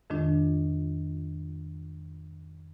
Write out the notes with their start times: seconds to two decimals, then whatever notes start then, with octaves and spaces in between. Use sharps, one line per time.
0.10 F2 A2 D#3 G#3 D4 F4